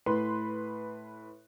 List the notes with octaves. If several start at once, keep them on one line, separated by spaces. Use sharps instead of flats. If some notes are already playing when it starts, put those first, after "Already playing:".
A2 B4 C6